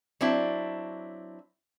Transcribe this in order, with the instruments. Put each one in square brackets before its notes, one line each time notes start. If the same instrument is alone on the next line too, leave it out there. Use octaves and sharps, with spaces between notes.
[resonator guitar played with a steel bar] F#3 C4 D4 E4